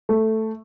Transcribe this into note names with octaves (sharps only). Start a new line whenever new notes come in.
A3